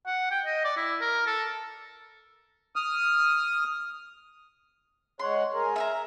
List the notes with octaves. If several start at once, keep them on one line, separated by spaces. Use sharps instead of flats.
F#5
G5
D#5
D5
E4
A#4
A4
D#6 F6
G#3 C#5 F#5 C6
G#4 A#4
E5 G#5 A#5